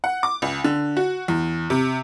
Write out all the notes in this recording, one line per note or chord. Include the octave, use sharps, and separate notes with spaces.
F#5
D6
C#2
D3
F#4
E2
C3